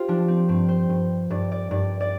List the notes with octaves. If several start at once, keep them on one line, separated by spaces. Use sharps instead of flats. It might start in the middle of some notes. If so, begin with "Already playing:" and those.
Already playing: F4 G4 C5
F3 D4
C4
G2 C4
C5
G2
G2 D5
D5
G2 D5
D5